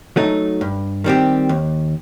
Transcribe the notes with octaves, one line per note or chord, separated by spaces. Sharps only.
F#3 A3 D#4
G2
D#3 G3 C4 G4
D#2